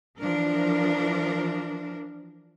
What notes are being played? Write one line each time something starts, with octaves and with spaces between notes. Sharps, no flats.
E3 F3 D4 A#4